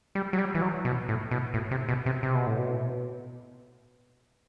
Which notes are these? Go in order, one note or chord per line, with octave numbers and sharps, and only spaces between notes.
G3
F#3
G3
E3
F#3
B2
A2
B2
A2
C3
B2
C3
C3
B2
A2
B2